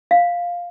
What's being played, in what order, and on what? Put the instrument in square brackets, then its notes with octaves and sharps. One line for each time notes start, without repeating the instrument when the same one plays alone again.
[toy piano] F5